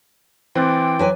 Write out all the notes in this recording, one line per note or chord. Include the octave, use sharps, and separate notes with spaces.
E3 C4 G5 C6 D6 F#6 A6
F#3 B4 G#5